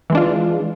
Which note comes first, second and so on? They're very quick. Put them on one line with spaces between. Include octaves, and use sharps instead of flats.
E3 G#3 D4 F4